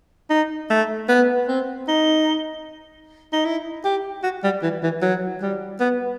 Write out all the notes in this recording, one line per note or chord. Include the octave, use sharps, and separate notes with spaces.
D#4
A3
B3
C4
D#4
D#4
E4
G4
F#4
G3
E3
E3
F#3
G3
B3